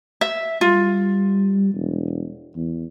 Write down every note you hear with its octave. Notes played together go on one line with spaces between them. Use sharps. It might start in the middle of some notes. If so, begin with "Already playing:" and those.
E5
G3 F4
E1
E2